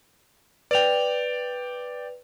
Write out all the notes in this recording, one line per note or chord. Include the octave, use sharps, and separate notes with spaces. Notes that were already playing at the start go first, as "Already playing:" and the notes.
B4 D5 G5 F7